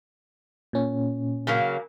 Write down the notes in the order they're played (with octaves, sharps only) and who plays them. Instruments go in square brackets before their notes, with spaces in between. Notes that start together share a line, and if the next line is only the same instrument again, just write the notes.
[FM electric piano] A#2 C#4
[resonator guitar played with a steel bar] C#3 F#3 A#3